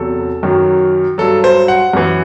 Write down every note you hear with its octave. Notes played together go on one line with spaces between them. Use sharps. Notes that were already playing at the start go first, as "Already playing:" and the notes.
Already playing: E2 C3 F#3 A4
F#2 D#3 F#3
G2 F#3 A4
C5
F#5
F#2 E3